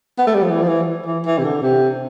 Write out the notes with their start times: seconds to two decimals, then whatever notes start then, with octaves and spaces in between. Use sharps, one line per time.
0.18 B3
0.27 A3
0.34 G3
0.42 F3
0.50 E3
0.62 F3
0.68 E3
1.06 E3
1.25 E3
1.38 C3
1.44 D3
1.62 C3